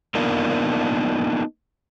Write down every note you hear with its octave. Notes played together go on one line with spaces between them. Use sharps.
A#3 B3 D4 D#4 F4 A#4